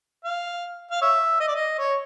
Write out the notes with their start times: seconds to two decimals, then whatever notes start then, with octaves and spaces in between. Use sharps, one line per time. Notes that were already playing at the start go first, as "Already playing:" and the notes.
0.24 F5
0.91 F5
1.01 C#5 E5
1.40 D#5
1.48 D5
1.55 D#5
1.79 C#5